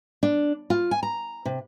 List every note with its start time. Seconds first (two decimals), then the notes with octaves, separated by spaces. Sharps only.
0.23 D4
0.70 F4
0.91 G#5
1.03 A#5
1.45 C3